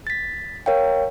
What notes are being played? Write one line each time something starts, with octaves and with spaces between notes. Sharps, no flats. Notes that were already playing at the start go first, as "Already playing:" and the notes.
A6 B6
A#4 C#5 F5 G5